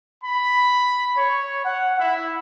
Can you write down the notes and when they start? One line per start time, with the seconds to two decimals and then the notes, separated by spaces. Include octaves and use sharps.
0.24 B5
1.17 C#5
1.65 F#5
1.99 E4